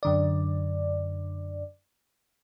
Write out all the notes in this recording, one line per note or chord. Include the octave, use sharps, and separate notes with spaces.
F#2 D3 D5